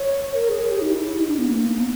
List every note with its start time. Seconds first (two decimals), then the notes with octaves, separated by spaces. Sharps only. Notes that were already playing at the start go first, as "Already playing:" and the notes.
Already playing: C#5
0.34 A#4
0.49 G#4
0.62 G#4
0.71 G4
0.81 D#4
0.90 E4
1.19 D#4
1.28 D4
1.38 B3
1.48 A#3
1.62 A#3
1.77 B3